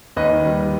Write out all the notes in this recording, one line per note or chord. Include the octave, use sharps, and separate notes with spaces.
D#2 B4 D#5
D#3
G3